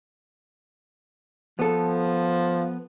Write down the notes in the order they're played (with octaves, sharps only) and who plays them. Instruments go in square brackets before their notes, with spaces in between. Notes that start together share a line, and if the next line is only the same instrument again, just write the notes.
[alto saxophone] F3 [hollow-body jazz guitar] B3 A4